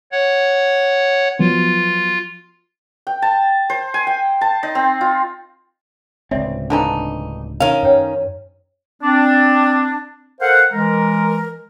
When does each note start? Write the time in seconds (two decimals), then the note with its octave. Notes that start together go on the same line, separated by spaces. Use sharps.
0.12 C#5 F#5
1.39 F3 F#3 B3 F4
3.07 G5
3.22 A5
3.70 C5
3.94 G#5
4.07 G5
4.41 A5
4.63 D#4
4.75 C4
5.01 F4
6.31 D1 C#2 C4 D5 E5
6.70 D3 E3 D4 D#4 F5 G#5
7.60 D#3 C#4 F5
7.83 F#2 B4 C#5 G5
9.02 C4 D4
10.41 A4 A#4 C5 F5 F#5
10.72 E3 G#3 A#4